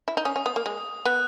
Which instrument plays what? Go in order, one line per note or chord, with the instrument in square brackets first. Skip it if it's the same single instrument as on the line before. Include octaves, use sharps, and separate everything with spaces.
[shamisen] E4
D#4
[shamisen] C#4 [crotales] D#6
[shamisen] C#4
[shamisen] B3 [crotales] D#6
[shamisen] A#3
G#3
[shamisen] B3 [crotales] F#6